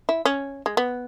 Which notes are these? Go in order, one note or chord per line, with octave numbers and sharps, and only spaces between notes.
E4
C#4
G#3
B3